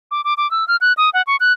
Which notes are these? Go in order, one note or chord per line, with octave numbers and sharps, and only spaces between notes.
D6
D6
D6
E6
F6
F#6
D#6
F#5
C#6
F#6